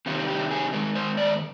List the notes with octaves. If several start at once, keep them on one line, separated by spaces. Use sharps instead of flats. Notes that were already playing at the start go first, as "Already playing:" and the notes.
C3 D#3 G3 F4
G4
G#4
G#2 D#3 G#3 A#4
C5
D5